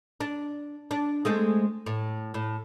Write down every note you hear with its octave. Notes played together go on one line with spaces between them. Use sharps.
D4
D4
G#3 A3 C4
A2
A2